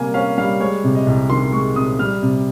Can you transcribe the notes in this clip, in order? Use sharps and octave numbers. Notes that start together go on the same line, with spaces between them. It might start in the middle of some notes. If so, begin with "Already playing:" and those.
Already playing: C3 G3 A#3 G#5
C#4 F5
G3 F5
G#3 C#5
C3
D#5
C2
D#3 C6
G#3 C#6
C3 D#6
G3 F6
C3